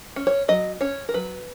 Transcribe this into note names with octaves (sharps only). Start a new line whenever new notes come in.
C#4
C#5
F#3 D#5
C#4 C#5
A#4
F#3 B4